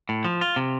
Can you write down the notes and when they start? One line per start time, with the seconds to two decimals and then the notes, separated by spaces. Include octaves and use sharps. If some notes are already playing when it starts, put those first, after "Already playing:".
0.09 A2
0.25 F3
0.41 F4
0.56 C3